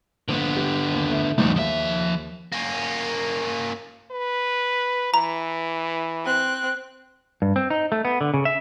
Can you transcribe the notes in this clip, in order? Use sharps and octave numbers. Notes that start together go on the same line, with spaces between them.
A#1 D3 B3
G4
D#2
A3
A#1 E2 G#2 F#3 D#4
D#2 F3 E5
A#3 C#4
B4
E3 A#5
C4 F#6
G2
C4
D#4
A3
B3
D3
C#3
E5